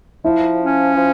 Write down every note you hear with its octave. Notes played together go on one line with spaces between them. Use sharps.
F3 E4
C#4
F3